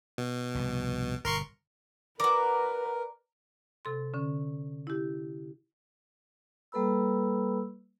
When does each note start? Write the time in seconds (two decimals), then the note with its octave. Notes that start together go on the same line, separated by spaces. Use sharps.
0.18 B2
0.55 F1 C2 G2
1.25 G1 B2 A#4 C6 C#6
2.20 F#4 A#4 B4 D5 A#5 D6
3.85 C3 A4 C6
4.14 D3 C#4
4.87 E4 G4
6.72 G3 A#3 A4 B4 B5 E6